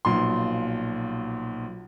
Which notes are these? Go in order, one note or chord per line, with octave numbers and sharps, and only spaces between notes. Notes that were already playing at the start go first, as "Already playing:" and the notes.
B1 A#2 F3 C6